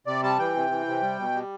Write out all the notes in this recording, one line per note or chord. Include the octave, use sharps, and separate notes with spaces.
C3 D5
G3 A5
E3 G5
C3
E3
C3
G3
B2
G3